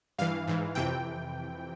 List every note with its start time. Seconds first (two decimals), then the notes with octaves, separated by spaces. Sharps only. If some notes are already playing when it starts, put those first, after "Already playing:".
0.19 G2 E3 F5
0.47 G#2 E3
0.75 F2 C3 E3 G5